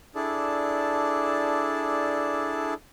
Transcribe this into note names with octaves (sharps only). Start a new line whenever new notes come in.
D4 E4 G#4 A4 D5 A5